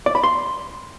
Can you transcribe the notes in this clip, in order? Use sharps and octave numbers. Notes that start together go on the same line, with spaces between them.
D5
B5
C6